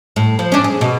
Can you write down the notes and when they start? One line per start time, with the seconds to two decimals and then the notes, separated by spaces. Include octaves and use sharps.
0.16 A2
0.39 F3
0.52 C#4 D4
0.64 G#4
0.81 B2